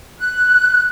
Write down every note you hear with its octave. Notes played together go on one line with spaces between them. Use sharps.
F#6